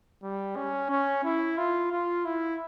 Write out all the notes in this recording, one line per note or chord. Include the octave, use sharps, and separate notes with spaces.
G3
C#4
C#4
E4
F4
F4
E4